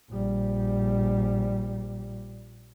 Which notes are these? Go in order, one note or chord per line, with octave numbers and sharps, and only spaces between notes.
A#1 G3